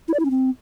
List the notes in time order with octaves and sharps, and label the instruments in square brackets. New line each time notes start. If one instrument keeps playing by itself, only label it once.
[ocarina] E4
D5
E4
C#4
C4